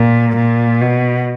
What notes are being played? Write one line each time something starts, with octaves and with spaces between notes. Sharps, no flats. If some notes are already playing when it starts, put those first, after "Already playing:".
Already playing: A#2
A#2
B2